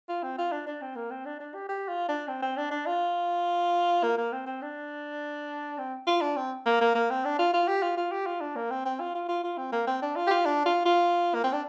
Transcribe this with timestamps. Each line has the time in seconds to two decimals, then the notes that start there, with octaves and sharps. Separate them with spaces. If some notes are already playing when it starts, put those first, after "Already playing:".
0.09 F4
0.23 C4
0.38 F4
0.52 D4
0.67 D4
0.82 C4
0.96 A#3
1.11 C4
1.26 D4
1.40 D4
1.54 G4
1.69 G4
1.89 F4
2.09 D4
2.28 C4
2.42 C4
2.57 D4
2.71 D4
2.87 F4
4.03 A#3
4.18 A#3
4.33 C4
4.46 C4
4.62 D4
5.79 C4
6.07 F4
6.22 D4
6.37 C4
6.66 A#3
6.81 A#3
6.95 A#3
7.10 C4
7.25 D4
7.39 F4
7.54 F4
7.68 G4
7.83 F4
7.97 F4
8.12 G4
8.26 F4
8.41 D4
8.56 A#3
8.71 C4
8.85 C4
9.00 F4
9.15 F4
9.29 F4
9.44 F4
9.58 C4
9.72 A#3
9.87 C4
10.02 D4
10.16 F4
10.27 G4
10.31 F4
10.45 D4
10.66 F4
10.85 F4
11.34 A#3
11.44 C4
11.52 D4